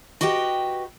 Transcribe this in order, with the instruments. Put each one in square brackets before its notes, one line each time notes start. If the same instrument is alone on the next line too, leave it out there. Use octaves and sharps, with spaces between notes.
[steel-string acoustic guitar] F#4 G4 B4 D#5 G5